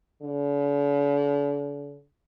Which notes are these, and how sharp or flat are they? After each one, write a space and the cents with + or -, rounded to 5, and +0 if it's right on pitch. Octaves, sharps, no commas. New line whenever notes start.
D3 -45